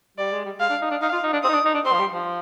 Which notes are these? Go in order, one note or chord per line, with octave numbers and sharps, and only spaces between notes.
G3 D5
G#3
G3
G#3 F5
D4
D#4
D4
D#4 F5
F4
D#4
D4
C4 D#6
D#4
D4
D#4
D4
C4 C6
F3
G3
F3